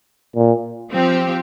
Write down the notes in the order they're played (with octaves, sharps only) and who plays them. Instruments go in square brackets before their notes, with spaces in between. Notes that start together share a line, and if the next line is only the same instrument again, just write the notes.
[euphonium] A#2
[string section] F3 C4 G4